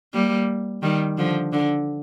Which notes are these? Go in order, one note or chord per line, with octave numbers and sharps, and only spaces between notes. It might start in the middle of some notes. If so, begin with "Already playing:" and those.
G3 A#3
D#3 G3
D3 F3
D3